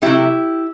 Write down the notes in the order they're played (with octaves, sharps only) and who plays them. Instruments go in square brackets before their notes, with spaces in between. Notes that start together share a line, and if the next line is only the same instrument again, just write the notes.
[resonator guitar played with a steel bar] C3 F#3 A3 E4 G4